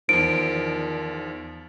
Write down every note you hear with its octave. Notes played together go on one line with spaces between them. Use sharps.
E2 D#3 F3 D7